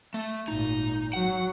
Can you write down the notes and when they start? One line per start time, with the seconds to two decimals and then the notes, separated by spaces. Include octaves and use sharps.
0.14 A3
0.48 G#1 A#2 D#4
1.13 F#3 F#5